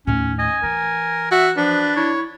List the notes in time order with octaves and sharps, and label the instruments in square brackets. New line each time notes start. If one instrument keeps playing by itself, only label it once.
[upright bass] D#2 A2 [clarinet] C#4
[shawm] D#5 [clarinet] G#5
[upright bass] E3 [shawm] A#4
[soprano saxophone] F#4 [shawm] E5
[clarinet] F3 [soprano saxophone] D4 [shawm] B4
[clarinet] E4 [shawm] C#5